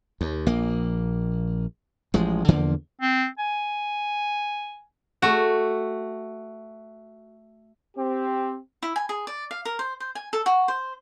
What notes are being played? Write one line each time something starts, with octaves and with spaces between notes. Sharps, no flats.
D#2
A#1 A#3
A1 F3 G#3
E2 D3 F3 A#3
C4
G#5
A3 F#4
C4 G4
E4
G#5
G#4
D5
F5
A#4
C5
C5
G#5
A4
F#4
C5